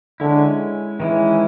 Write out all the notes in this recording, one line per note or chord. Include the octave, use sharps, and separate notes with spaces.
D3 G#3 C#4 E4
D#3 E3 G#3 C#4